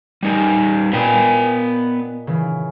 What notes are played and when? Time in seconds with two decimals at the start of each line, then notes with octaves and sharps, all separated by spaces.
0.23 G3 D#4 G4 G#5 D#7
0.93 A#2 B3 B4 D#5 G5 G#5
2.27 C#3 E3